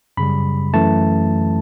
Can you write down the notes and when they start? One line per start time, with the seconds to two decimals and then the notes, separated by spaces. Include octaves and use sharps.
0.17 F#2 C#3 G3 B5
0.74 F#2 E3 A3 A5